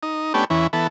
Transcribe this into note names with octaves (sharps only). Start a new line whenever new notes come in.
D#4
A3 B3 C#4 D4 G4
E2 E3 C#4
E3 B3 A4